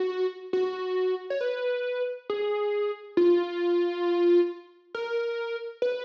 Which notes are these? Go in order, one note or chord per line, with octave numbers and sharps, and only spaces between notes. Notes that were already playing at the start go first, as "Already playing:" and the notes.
Already playing: F#4
F#4
C#5
B4
G#4
F4
A#4
B4